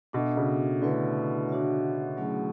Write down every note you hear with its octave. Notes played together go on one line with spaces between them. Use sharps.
B2 D4 F#4 A4 E5
C#3
D3 A3 E4 B4 E5
D4 F#4 C#5 E5
F#3 A3 C#4 E4 G#4